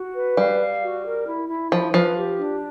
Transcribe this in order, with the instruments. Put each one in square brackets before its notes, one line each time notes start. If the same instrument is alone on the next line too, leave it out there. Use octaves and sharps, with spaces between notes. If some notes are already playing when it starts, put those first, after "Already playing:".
Already playing: [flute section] F#4
B4
[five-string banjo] G3 [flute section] F5
[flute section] F5
F#4
A#4
E4
E4
[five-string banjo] F3 [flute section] E4
[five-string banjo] F3 [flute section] B4
[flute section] G4
D4